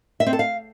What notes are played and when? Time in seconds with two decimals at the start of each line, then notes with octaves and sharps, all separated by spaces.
0.20 E5
0.26 C4
0.33 A4
0.39 F5